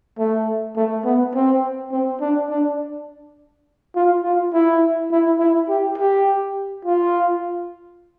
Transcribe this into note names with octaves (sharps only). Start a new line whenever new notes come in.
A3
A3
B3
C4
C4
D4
D4
F4
F4
E4
E4
E4
G4
G4
F4